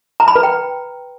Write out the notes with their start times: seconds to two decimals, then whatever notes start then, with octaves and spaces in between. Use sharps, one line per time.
0.20 A#5
0.28 B5
0.36 B4
0.43 G5